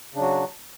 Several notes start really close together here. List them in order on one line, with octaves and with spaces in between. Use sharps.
C#3 D4 F#3 F#4